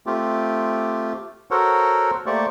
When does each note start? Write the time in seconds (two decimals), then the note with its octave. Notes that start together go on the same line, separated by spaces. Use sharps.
0.06 A3 C4 F4 G4
1.51 F#4 A4 A#4 C5 C#5 F#5
2.26 A3 A#3 G4 C5 D5 C#6